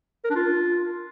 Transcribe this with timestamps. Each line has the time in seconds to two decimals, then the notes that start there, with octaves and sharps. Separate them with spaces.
0.24 A#4
0.30 D4
0.36 F4